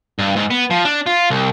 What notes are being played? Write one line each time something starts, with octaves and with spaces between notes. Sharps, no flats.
G2
G#2
B3
F3
D4
F4
C2